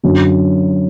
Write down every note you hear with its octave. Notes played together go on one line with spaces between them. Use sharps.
F#2 D3 F#3